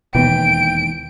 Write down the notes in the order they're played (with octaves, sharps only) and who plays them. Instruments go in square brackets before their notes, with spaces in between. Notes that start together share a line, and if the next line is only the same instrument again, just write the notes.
[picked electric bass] E1 D#2 E3 [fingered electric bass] B2 B3 [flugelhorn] G5 [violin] D7